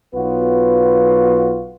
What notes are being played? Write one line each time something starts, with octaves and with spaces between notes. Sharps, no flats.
B1 F#3 B3 F4 F#4 B4